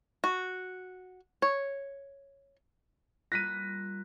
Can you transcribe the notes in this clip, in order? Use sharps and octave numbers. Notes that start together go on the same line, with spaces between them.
F#4
C#5
G3 A#3 F4 F#6 A#6 B6 D#7